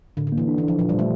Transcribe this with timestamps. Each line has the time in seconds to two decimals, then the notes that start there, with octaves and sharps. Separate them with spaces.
0.17 A2 D3
0.27 D3
0.32 A#3
0.38 E3
0.48 D4
0.58 E3
0.63 D4
0.68 F3
0.78 A#2 F3
0.89 G3
0.94 A#2 A3